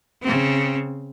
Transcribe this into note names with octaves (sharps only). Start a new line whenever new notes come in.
C#3 C4